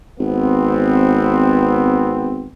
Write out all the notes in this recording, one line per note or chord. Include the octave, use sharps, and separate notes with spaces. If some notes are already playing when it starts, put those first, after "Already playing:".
G#1 B3 C4